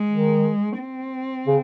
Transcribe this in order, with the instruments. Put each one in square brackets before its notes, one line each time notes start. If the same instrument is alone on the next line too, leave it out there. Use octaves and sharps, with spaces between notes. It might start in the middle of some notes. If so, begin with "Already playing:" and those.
Already playing: [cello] G#3
[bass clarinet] D#3
[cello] C4
[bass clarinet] C#3